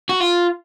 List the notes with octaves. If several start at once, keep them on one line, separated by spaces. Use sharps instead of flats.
F#4
F4